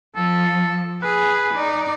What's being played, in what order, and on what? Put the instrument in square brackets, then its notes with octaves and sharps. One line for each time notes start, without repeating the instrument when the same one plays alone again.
[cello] F3 [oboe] A4
[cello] G#4 [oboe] B4
[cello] D#4 D5